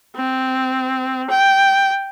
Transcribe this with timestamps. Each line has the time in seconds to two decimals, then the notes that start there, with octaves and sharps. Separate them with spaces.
0.16 C4
1.30 G5